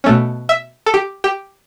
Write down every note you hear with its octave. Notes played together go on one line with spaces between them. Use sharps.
B2 A3 C#4
E5
A4
G4
G4